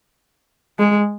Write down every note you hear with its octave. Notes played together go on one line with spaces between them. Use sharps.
G#3